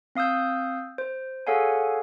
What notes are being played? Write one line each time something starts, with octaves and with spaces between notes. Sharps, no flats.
C4 F5 D#6 E6 G6
C5
G#4 A4 C#5 F5 F#5 G#5